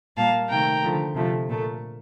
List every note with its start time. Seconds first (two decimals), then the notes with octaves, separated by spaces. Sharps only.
0.17 A#2 G3 A#3 F5 A5
0.49 C3 D#3 A3 G5 A#5
0.83 D3 F3 A3
1.15 C3 F3 A3
1.49 A#2 A3